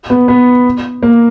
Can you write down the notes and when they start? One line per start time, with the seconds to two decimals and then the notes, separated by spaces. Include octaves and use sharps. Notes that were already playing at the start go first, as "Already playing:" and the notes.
0.10 B3
0.28 B3
1.03 A#3